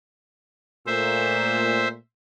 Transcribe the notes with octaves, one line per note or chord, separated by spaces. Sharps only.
A#2 A3 C5 E5